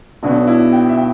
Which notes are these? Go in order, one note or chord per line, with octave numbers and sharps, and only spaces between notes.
B1 B2 B3 D4
E4
G5
E5
G5